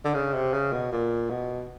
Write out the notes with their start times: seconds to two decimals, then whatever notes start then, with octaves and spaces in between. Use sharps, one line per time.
0.05 D3
0.14 C#3
0.33 C3
0.53 C#3
0.73 B2
0.92 A#2
1.30 B2